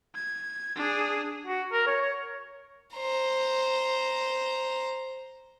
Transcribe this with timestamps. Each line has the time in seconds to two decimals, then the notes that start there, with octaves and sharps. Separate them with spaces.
0.15 G#6
0.76 D4 G#4
1.47 F#4
1.73 A#4
1.87 C#5
2.01 C#5
2.96 C5 A#5